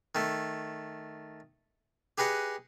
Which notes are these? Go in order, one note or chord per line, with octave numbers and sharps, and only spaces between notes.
D#3 A3
G4 G#4 B4 D#5 F#5